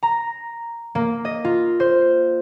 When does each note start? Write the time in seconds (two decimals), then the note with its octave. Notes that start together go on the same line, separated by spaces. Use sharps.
0.03 A#5
0.95 A#3
1.25 D#5
1.45 F4
1.80 C5